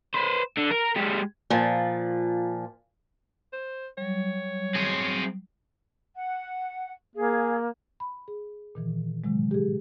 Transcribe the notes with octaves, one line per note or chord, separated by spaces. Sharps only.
B4 C5
D3
A#4
G#3 G4
A#2 F3
C5
F#3 G3 C#5
C4 G#4
F#5
A#3 G#4 F5
B5
G#4
A#2 D#3 E3
A2 C3 D#3 F#3 G#3
G4 G#4